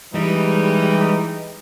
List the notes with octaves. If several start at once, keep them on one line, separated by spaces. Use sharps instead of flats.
E3 G3 G#3 D#4